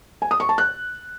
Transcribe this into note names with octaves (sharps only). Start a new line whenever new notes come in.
G#5
D#6
C#6
A5
F#6